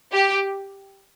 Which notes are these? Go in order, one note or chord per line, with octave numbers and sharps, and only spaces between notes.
G4